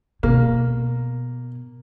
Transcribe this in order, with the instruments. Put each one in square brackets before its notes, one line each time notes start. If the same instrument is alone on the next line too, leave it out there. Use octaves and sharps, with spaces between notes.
[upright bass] B2 [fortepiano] A#3